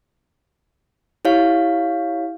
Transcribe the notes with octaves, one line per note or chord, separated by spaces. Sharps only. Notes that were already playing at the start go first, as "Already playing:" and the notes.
E4 G4 C#5 F5